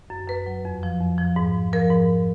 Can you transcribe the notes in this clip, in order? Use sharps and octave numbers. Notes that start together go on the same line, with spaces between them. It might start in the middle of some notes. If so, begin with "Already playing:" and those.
F#2
F#2 B4
F#3
F2
F3
F2
F3
G#2
F3
F3 A#4
G#2